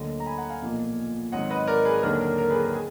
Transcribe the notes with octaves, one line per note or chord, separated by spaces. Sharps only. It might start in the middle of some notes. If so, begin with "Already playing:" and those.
Already playing: D2 D3 F#3 A#3 D#5
A#5
G#5 B5
F#5 A#5
F5 G#5
B1 A#2 F3 A#3
G#1 G#2 F#3 D#5 F#5
B4 D#5
A#4 D5
G#4 B4
D#2 D3 F#3 D4 A#4
A#4
A#4
G#4 B4
A#4
G#4